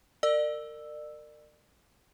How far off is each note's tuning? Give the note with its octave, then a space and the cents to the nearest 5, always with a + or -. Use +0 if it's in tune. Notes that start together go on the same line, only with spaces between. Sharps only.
A#4 -25 D5 +35 E6 +0